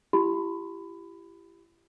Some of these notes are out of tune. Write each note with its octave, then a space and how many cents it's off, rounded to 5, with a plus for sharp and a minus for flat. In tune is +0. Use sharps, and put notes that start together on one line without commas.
E4 +40 G4 +0 B5 +20